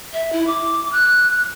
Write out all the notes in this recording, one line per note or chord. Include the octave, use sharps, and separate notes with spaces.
E5
E4
D6
F#6